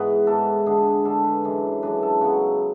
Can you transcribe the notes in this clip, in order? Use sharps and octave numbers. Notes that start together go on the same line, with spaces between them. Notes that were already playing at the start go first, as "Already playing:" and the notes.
Already playing: G#2 E3 G#3 B3 B4
G#2 E3 G#3 B3 A4
D3 G#3 D4 G#4
D3 G#3 D4 A4
B4
F#2 E3 G#3 D4
F#2 E3 G#3 D4 B4
A4
C#3 F#3 B3 F#4